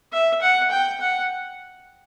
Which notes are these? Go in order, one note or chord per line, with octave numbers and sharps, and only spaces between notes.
E5
F#5
G5
F#5